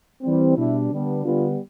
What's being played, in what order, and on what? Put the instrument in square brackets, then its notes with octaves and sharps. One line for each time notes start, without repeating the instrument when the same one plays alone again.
[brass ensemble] E3 G3 C4
B2 G3 D4 E4
D3 G3 B3 D4
D3 G3 B3 F4